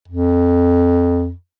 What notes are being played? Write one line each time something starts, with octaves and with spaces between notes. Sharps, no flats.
F2